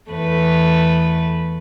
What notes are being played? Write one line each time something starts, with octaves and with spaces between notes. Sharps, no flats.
E2 A3 B4